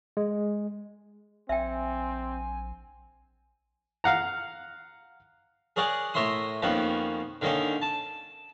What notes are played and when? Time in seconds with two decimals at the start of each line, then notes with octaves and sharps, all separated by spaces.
0.17 G#3
1.49 A#1 C4 E5 G5 G#5
4.04 F5 F#5 A#5
5.76 G#4 A#4 C#5 D5 F#5 G#5
6.14 A2 A#4 C#5 E5 C6 D#6
6.62 F2 D#3 A#3 B3 C#4
7.41 D3 D#3 A#3 C#4 D#4
7.82 A5